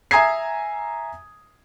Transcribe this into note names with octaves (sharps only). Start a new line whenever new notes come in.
E5 G#5 A#5 D#6 G#6 C7